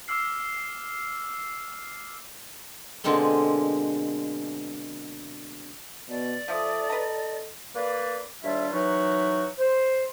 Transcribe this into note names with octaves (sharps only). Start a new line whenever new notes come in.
D6 E6 F6 C7
B2 D3 G#3 A#3 C4
B2 D5
F3 A4 E5 D6 D#6
B4 D#5 A#5
A#3 B4 D5
D#2 G3 D4 E4 F4 E5
E3 F#3 D#4 F#4 A#4 B4
C5